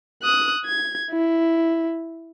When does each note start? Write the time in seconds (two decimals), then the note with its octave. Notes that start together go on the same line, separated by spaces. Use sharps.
0.22 D#6 F#6
0.65 G#6
1.10 E4